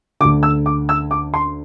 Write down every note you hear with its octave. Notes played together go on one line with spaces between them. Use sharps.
D2 D3 D6
E6
D6
E6
D6
C6